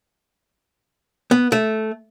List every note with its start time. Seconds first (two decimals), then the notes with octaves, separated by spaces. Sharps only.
1.31 B3
1.52 A3